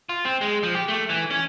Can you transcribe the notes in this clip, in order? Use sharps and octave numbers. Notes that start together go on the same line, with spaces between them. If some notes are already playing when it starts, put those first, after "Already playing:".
F4
C4
G#3
F3
G4
A3
E3
C#4